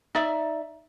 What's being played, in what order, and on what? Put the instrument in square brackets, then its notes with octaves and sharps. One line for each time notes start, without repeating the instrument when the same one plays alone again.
[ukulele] D#4 D5 E5